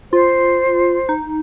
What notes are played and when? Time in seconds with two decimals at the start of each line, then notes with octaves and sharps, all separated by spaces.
0.12 F4 C5
1.09 D#4